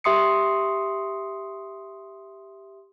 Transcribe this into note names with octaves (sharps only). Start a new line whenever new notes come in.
G4 E5 C6 D#6 C7 C#7